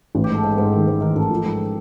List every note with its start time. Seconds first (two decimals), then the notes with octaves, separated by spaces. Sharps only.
0.15 A1
0.24 G4
0.29 G#2 A4
0.43 G#2
0.58 G#2
0.73 D#3
0.87 G#2
1.01 D#3 A#4
1.16 A1 A4
1.30 F3
1.44 G#2